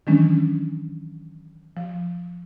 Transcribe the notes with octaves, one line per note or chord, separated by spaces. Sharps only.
D#3 E3 F#3 G#3 C#4 D4
F3